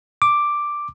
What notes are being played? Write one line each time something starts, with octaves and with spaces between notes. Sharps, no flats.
D6